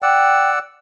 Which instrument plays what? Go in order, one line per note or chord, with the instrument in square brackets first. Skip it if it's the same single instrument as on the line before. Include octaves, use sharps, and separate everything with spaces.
[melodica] D5 F#5 E6 [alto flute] G5